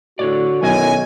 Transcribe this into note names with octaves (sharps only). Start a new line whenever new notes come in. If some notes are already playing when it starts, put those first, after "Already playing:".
A2 D3 F#4 C#5 D5
B1 F#2 D#3 E4 D#5 G#5